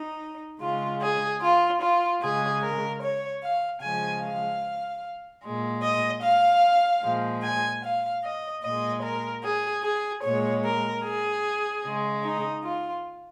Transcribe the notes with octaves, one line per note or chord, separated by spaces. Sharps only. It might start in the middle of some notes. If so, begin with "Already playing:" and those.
Already playing: D#4
C#3 G#3 F4
G#4
F4
F4
C#3 G#3 G#4
A#4
C#5
F5
C#3 F3 G#3 G#5
F5
A#2 G#3
D#5
F5
A#2 F3 G#3
G#5
F5
D#5
A#2 G#3 D#5
A#4
G#4
G#4
A#2 G#3 C#5
A#4
G#4
C#3 G#3
D#4
F4